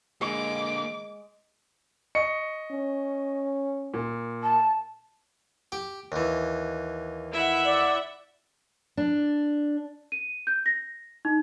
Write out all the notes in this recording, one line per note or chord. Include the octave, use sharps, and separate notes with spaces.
D3 G#3 A#3 D6
D#5 C#6 C#7
C#4
A#2
A5
G4
D#2 E3
E4 E5 F#5
D5
D4
D#7
G6
A#6
D#4